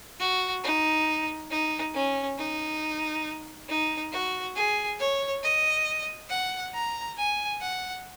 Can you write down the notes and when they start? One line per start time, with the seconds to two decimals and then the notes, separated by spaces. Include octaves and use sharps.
0.20 F#4
0.64 D#4
1.51 D#4
1.94 C#4
2.38 D#4
3.69 D#4
4.12 F#4
4.56 G#4
5.00 C#5
5.43 D#5
6.29 F#5
6.74 A#5
7.17 G#5
7.61 F#5